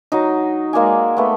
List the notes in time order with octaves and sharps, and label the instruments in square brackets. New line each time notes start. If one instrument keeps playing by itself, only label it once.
[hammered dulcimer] F#3 D#4
G#3 A#3 D5 G#5
A3 B3